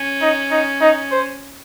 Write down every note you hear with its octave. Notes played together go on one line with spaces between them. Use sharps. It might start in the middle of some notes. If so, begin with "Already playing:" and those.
Already playing: C#4
D#4
D#4
D#4
C5